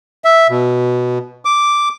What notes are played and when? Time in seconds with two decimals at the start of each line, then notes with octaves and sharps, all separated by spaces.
0.24 E5
0.49 B2
1.45 D6